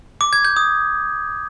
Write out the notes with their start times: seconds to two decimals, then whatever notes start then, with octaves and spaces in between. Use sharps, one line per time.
0.21 D6
0.33 G#6
0.45 G6
0.56 D#6